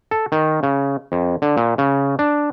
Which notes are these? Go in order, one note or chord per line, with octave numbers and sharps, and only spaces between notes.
A4
D#3
C#3
F2
D3
A#2
C#3
D4